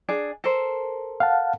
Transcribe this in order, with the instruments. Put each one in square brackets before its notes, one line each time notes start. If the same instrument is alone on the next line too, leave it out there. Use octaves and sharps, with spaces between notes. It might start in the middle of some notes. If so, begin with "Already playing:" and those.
[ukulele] D4 G#4 D5
A4 A#4 C5
[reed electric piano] F5 F#5 A5